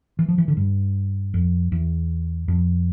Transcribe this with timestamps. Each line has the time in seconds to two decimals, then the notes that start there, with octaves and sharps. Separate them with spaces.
0.19 E3
0.28 F3
0.38 E3
0.48 D3
0.57 G2
1.34 F2
1.72 E2
2.48 F2